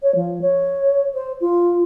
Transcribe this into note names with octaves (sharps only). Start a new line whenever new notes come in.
C#5
F3
C#5
C5
F4